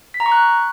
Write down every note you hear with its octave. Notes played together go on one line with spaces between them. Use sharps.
B6
A#5
C#6
F#6